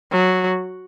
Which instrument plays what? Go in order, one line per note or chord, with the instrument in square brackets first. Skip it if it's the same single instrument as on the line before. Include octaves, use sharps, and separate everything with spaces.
[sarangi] F#3